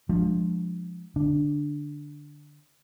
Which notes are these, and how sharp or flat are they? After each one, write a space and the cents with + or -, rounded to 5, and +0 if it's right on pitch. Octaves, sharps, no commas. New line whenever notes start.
F3 +10 G#3 +0 D4 +0
D3 +0 D4 +0